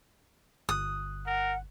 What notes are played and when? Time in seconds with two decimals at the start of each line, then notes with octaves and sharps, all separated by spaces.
0.69 G1 D#6 F#6
1.27 A#4 F#5